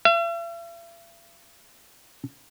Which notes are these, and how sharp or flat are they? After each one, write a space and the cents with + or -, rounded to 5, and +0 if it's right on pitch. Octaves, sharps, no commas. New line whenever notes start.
E5 +45